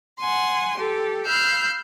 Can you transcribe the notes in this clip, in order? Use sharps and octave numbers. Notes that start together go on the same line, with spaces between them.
F#5 G#5 C6
G4 A4
F5 B5 E6 F6 G6